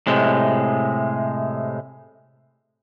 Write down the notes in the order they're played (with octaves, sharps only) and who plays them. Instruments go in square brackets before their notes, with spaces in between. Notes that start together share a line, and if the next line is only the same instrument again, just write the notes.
[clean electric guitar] A2 C3 G#3